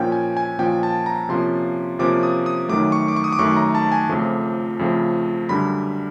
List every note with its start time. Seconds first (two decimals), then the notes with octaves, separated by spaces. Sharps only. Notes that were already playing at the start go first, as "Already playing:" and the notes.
Already playing: A#2 F3 A#3 C#4 G5
0.12 G#5
0.37 G#5
0.59 A#2 F3 A#3 C#4 G5
0.83 A5
1.06 A#5
1.29 C3 F3 A#3 C#4 C6
1.99 C3 F3 A#3 C#4 D6
2.23 D#6
2.46 D#6
2.69 F#2 D#3 F#3 A3 D6
2.92 C#6
3.08 D6
3.16 C#6
3.24 D#6
3.32 D6
3.39 F#2 D#3 F#3 A3 C#6
3.56 A#5
3.75 A5
3.92 G#5
4.09 F2 C#3 F3 A3
4.79 F2 C#3 F3 A3
5.49 F#2 D3 G3 B5